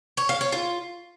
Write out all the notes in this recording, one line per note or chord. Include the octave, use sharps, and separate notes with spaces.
C#5
F5
C#5
F4